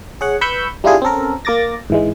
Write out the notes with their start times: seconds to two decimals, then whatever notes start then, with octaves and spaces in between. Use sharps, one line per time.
0.21 G#4 C#5 F#5
0.41 B4 B5 C#6 E6 G6
0.84 G3 D4 E4 F4 G4 G#4
1.02 C4 C#4 A4 A#4
1.45 A#3 A#4 D6 A6 A#6
1.90 G#2 E3 G#3